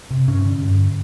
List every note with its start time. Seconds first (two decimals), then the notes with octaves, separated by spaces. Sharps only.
0.11 C3
0.28 G2 C#4
0.45 D3
0.62 G2